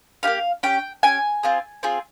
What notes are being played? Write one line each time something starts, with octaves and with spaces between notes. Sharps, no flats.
A#3 D#4 G4 F5
C#4 G4 G5
C#4 G4 G#5
C4 F4 G#4
C4 F4 G#4